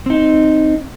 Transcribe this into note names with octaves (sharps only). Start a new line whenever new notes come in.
C4 D#4